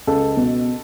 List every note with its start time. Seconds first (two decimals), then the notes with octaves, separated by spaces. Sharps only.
0.07 C#2 A4
0.37 B2